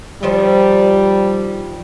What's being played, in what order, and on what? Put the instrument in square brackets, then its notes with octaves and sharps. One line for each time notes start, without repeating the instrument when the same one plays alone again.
[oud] D#3 F3 C5 [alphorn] G3